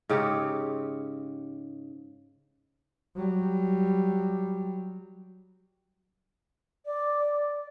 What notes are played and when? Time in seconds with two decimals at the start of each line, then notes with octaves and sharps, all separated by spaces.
0.09 G#2 C#3 G4 C#5
3.16 F#3 G3
6.85 D5